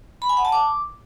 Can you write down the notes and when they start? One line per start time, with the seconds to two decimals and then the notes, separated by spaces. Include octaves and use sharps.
0.22 B5
0.29 G#5
0.37 F#5
0.45 A5
0.52 D6